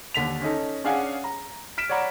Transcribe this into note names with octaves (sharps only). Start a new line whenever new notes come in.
D#2 D3 B6 F7
C#4 D#4 A4
C#4 D4 G#4 F5 F#5 G#5
A#5
F6 B6 D7 E7
C#5 D5 F#5 A#5 B5